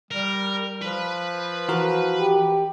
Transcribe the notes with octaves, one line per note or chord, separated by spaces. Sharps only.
G3 A#4
F3 B4 B5
E3 F#4 A#4
G4